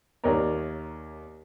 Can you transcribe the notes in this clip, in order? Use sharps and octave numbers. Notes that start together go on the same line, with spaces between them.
D#2 A#4 C#5 D5 A#5